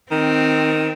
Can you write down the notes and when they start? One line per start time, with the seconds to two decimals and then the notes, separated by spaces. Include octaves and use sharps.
0.11 D#3 C4